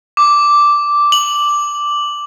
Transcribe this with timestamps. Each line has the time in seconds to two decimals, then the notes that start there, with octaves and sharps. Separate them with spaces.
0.17 D6
1.12 F#7